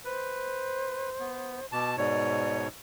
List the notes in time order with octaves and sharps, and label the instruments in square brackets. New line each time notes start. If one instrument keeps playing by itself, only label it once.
[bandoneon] B4 [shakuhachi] C5
[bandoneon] B3
[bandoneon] B2 A5 [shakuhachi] D6
[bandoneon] G#2 B2 C#5 [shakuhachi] D5